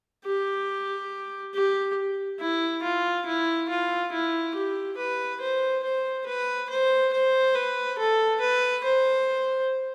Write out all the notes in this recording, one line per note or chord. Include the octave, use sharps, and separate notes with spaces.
G4
G4
E4
F4
E4
F4
E4
G4
B4
C5
C5
B4
C5
C5
B4
A4
B4
C5